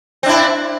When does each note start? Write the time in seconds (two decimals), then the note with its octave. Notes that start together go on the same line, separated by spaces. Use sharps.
0.23 C4
0.26 D4
0.29 E4